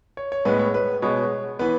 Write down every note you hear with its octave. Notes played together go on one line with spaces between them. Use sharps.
C#5
C#5
A2 G#3 B3 B4
C#5
B4
B2 G#3 B3 C#5
E3 B3 B4